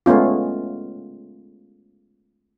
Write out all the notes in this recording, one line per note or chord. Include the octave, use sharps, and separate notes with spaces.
G#3 A3 B3 C#4 F4